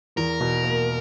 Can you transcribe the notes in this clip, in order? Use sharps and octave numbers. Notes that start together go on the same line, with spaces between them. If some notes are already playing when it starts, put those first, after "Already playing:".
E2 A#4
B2
A#3